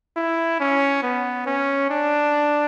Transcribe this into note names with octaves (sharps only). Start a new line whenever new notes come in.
E4
C#4
B3
C#4
D4